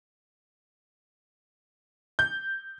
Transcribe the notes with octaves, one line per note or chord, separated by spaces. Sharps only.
G6